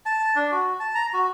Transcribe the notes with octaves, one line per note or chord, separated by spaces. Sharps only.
A5
D4
F#4
A5
A#5
F#4